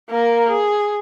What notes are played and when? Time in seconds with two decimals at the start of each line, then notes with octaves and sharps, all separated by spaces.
0.10 A#3 A#4
0.50 G#4